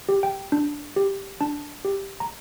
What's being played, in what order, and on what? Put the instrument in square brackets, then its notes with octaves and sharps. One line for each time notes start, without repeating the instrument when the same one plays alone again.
[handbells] G4
G5
D4
G4
D4 A5
G4
A#5